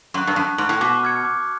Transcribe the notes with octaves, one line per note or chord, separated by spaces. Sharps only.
F#2 C#6 F#6
G2
F#2 A5
G#2 C#6 F#6
A2
B2 D6
F6 G#6 C#7
D6